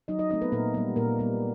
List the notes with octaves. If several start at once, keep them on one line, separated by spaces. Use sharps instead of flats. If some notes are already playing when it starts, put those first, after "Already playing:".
F#3 D#4 D#5
D#4 D#5
A3 C4 D#4 D#5
B3 B4
A#2 A#3 A#4
G3 B3
A#2 A#3 A#4
G3 B3